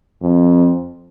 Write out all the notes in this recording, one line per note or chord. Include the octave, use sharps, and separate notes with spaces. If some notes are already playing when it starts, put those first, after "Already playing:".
F2